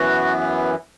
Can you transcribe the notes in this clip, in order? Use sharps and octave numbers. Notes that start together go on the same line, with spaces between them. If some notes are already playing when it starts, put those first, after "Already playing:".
Already playing: F#2 E3 B3 F#4